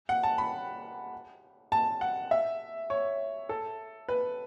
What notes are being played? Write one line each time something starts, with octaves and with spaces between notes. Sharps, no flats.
F#5
A5
B5
A5
F#5
E5
C#5
A4
B4